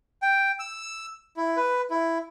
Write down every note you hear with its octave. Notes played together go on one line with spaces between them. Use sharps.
G5
E6
E4
B4
E4